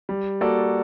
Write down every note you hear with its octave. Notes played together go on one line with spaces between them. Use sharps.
G3
A#3 F#4 A4 D5